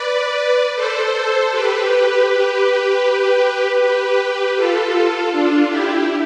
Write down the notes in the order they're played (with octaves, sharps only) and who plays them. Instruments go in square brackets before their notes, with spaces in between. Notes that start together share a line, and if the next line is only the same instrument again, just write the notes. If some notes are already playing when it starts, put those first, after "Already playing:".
Already playing: [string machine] B4 D5
A4 C5
G4 B4
G4 B4
G4 B4
F4 A4
D4 F4
E4 G4